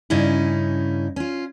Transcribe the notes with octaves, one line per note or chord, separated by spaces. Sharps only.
G2 C#3 C#4 D#4 E4
C#4 F4